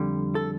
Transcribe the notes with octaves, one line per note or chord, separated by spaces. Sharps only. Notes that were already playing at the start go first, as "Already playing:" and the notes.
Already playing: F2 D3 G3
A4